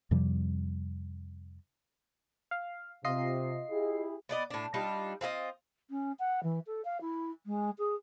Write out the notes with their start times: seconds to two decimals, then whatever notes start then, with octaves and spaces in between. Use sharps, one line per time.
0.11 F2 C3 F3 G3
2.51 F5
3.05 C3 F4 D#5 C7
3.69 E4 G4 G#4
4.29 B3 D5 D#5
4.50 A2 D4
4.74 G3 D4 D#4 F4
5.21 C4 F4 G#4 D#5
5.90 C#4
6.19 F#5
6.43 E3
6.66 A4
6.85 F5
7.01 E4
7.46 G#3
7.78 G#4